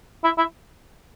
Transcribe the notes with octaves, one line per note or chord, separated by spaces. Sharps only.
E4
E4